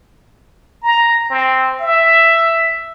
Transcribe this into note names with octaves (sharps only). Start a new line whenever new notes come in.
A#5
C4
E5